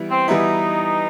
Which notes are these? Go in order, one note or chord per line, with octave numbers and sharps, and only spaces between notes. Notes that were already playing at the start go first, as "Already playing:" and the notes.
Already playing: E3 G3 B3 E4
C4
E3 G3 B3 D#4 E4